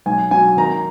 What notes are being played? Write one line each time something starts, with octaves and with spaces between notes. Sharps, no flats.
B1 G#5
F#3 G#5
D#3 A#5